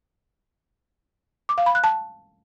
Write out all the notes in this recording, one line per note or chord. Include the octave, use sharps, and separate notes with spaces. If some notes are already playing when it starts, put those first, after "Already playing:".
D6
F5
B5
F#6
A5